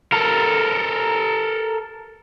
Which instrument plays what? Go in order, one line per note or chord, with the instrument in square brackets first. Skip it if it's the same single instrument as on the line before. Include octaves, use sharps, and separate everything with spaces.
[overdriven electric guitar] A4 A#4